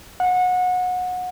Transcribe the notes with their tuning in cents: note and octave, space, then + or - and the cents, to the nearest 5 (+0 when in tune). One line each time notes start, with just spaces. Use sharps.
F#5 -25